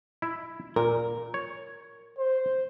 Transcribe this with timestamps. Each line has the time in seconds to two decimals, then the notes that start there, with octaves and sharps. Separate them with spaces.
0.22 E4 E5
0.76 A#2 A#4
1.34 C#5
2.18 C5